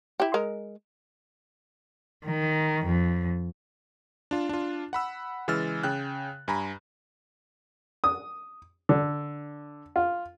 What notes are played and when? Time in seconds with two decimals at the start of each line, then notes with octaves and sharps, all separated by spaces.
0.20 E4 G4
0.34 G#3 A#4
2.25 D#3
2.84 F2
4.31 D4 F4
4.49 D4 F4
4.93 F#5 B5 E6
5.48 C#3 E3 G#3 E6 F6 A6
5.83 C#3 G5 F#6
6.48 G2 G#5 A#5 B5
8.04 D#6
8.89 D3
9.96 F4